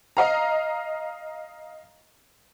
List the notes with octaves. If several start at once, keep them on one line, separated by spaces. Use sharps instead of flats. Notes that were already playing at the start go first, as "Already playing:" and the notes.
D#5 F5 A#5